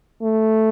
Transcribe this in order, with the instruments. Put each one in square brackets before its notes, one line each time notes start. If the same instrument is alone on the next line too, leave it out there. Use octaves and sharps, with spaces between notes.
[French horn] A3